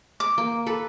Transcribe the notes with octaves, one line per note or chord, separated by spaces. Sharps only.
D6
A#3
A4 B4